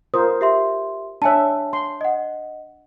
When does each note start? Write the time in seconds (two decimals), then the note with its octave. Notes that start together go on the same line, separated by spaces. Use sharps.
0.14 F4 A#4 C5 D#6
0.41 G4 E5 C6
1.22 D4 C#5 E5 G#5 A5
1.73 C6
2.01 D#5 F#5